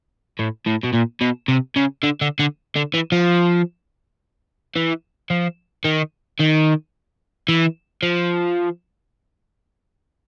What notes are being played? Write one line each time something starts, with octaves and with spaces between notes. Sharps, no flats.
A2
A2
B2
A#2
B2
C3
C#3
D3
D3
D3
D3
E3
F3
E3
F3
D#3
D#3
E3
F3